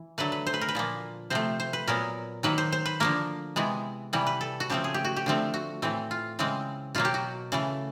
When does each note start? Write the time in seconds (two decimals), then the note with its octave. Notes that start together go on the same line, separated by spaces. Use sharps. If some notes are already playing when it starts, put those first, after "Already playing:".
Already playing: E3
0.18 D3 F#3 A3 B4
0.32 B4
0.47 C5
0.54 B4
0.61 A#4
0.69 B4
0.75 A#2 F3 A#3
1.30 C3 F3 A3 C5
1.60 C5
1.73 B4
1.87 A#2 F#3 B3 A#4
2.43 D#3 F#3 A#3 B4
2.58 C5
2.72 C5
2.86 B4
3.00 D3 F3 A#3 A#4
3.56 C3 E3 G#3 B3
4.13 C3 E3 G3
4.27 B4
4.41 A4
4.60 F#4
4.70 C#3 F3 A3 C4 G4
4.84 G#4
4.94 G4
5.05 F#4
5.16 G4
5.26 D3 F3 A3 C4
5.54 F#4
5.82 A2 E3 A3 C4
6.11 F4
6.39 C#3 E3 G#3 C4
6.95 B2 F#3 A#3 F4
7.05 G4
7.14 F#4
7.52 C#3 E3 A3